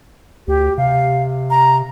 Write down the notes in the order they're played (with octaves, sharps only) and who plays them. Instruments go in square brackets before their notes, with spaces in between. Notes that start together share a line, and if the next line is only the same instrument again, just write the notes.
[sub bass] D2 [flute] G4
[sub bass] C3 [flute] F5
[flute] A#5